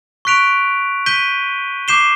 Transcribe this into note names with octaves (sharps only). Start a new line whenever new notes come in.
C#6 F#6 B6 D7 F7
G6 B6 D#7 G7
D6 G6 C7 E7 G7